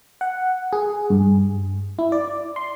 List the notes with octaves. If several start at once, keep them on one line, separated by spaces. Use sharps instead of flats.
F#5
G#4
G2
E4
D5
C6